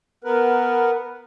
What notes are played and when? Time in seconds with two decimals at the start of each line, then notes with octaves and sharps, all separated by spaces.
0.24 B3 A#4 B4